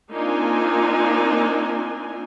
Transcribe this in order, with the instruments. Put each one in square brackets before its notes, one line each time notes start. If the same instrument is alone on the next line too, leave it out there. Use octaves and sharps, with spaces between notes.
[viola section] A#3 C4 D4 D#4 F4 G#5